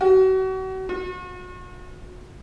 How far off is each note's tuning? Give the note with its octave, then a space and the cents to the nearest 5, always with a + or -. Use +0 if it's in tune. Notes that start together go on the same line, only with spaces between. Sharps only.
F#4 +35
F#4 -40